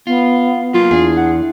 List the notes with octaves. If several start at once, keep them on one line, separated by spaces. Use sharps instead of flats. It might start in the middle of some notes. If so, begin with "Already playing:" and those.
B3 F4
F#3 A#3 F4
E2 D4 G#4
F#5